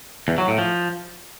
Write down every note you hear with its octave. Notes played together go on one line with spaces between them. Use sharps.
E2
F#3
A2
F3